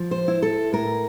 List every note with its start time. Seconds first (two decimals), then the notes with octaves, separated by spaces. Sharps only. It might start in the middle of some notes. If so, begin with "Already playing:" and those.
Already playing: F3
0.11 C5
0.28 E4
0.42 A4
0.73 A2 A#4